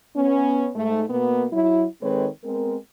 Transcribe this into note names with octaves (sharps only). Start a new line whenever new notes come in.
B3 C#4
G#2 A3
B2 A#3 B3
F#3 E4
D#3 G#3 C4 A4 B4 C#5
G#3 B3 C4 A#4